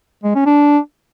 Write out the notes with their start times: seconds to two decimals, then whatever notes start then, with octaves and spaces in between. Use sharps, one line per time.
0.24 G#3
0.35 C#4
0.46 D4